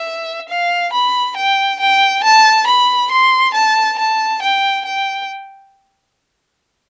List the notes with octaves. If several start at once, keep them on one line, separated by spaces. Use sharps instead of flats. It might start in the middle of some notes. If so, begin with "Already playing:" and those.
Already playing: E5
F5
B5
G5
G5
A5
B5
C6
A5
A5
G5
G5